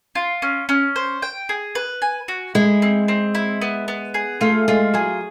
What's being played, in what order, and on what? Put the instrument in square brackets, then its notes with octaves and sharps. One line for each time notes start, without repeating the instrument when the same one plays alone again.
[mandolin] F4
C#4
C#4
C5
G5
G#4
B4
G#5
F#4
[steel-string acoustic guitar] G#3 [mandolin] E4
[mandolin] C4
C4
E4
B3
B3
G#4
[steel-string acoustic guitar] A3 [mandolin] F4
[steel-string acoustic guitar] G#3 [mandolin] F4
[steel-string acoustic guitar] F#3 [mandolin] G#4